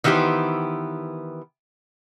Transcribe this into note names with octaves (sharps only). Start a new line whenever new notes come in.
D#3 E3 B3 G4 C5